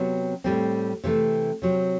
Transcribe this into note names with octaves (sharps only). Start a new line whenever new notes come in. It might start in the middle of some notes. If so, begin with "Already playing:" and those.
Already playing: C3 F#3 B3
A2 G3 C4
C3 E3 A3
C3 F#3 C4